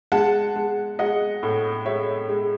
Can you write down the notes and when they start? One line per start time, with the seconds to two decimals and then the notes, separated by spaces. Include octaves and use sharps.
0.12 G#3 F#5 A5
0.56 G#3
0.99 G#3 D#5 F#5
1.43 A2
1.86 G#3 C#5 E5
2.29 G#3